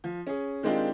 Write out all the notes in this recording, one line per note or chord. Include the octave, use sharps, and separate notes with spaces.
F3
C#4 G#4
D#3 G#3 C4 D4 F4 G4